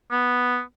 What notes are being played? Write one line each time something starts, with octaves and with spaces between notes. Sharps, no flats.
B3